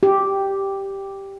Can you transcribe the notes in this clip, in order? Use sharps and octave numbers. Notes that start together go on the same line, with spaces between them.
G4